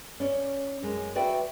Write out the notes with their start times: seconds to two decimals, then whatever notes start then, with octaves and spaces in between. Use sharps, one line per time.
0.20 C#4 D5
0.82 F#2 G#3 A#3
1.15 F#4 B4 D5 E5 G5